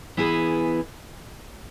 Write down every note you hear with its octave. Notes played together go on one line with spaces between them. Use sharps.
E3 B3 E4 G#4